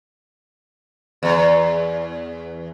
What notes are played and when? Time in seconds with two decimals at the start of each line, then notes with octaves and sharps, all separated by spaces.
1.23 E2